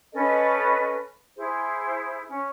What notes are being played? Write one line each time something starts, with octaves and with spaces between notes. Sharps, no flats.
C#4 A4 B4 D#5
E4 G#4 C5
C#4